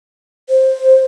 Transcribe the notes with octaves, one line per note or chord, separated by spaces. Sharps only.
C5